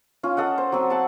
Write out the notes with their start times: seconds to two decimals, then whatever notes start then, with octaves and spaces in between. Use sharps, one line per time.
0.23 C#4 F4
0.37 A4 D#5 F#5
0.58 C5
0.72 F#3 C4
0.90 F#5 A5